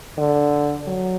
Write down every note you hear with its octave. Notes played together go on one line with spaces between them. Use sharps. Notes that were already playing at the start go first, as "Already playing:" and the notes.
D3
F#3